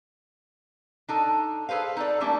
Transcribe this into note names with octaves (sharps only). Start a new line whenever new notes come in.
D4 D#4 A4
G#4 A4 B4 C5 F5
D#4 A4 D5
G3 A3 A#3 C#4 D4